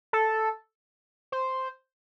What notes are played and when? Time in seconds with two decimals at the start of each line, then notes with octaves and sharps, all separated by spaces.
0.13 A4
1.32 C5